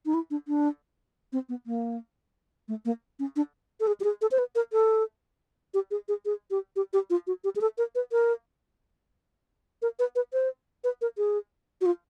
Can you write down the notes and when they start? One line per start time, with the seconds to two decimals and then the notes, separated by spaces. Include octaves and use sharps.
0.06 D#4
0.14 E4
0.31 D4
0.48 D4
1.33 C4
1.49 B3
1.66 A#3
2.68 A3
2.85 A#3
3.19 C#4
3.36 D4
3.80 A4
3.87 G#4
4.00 G4
4.04 G#4
4.22 A4
4.31 C5
4.39 B4
4.55 A#4
4.73 A4
5.74 G4
5.91 G#4
6.08 G#4
6.25 G#4
6.51 G4
6.76 G4
6.93 G4
7.10 F4
7.27 F#4
7.44 G4
7.56 G#4
7.61 A4
7.78 A#4
7.95 B4
8.12 A#4
9.82 A#4
9.99 B4
10.16 B4
10.33 C5
10.84 B4
11.02 A#4
11.18 G#4
11.81 F#4
11.86 F4